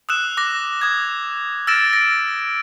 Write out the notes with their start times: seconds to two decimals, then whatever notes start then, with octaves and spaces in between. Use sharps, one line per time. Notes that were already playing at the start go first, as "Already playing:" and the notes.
0.09 D#6 E6 F#6 E7
0.37 D6 F#6 A#6
0.81 D#6 G#6
1.67 E6 F6 A6 A#6 D7 E7
1.93 A#6 D7